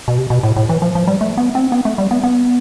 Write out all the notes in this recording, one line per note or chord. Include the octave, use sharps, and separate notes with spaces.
B2
C3
B2
A2
A2
E3
F3
F3
G3
A3
B3
C4
B3
A3
G3
B3
B3